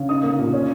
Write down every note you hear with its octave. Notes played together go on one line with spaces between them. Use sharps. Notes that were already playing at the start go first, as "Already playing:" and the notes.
Already playing: C#3
D#4 D#6
A#3
A#2
C#4